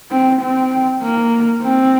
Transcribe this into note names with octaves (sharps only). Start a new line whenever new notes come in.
C4
C4
A#3
C4